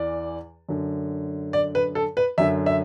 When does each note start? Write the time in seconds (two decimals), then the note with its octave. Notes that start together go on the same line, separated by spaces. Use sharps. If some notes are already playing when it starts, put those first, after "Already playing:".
Already playing: E2 E3 D5
0.69 F#2 D3
1.53 D5
1.75 B4
1.95 A4
2.17 B4
2.38 F#2 D3 E5
2.66 E5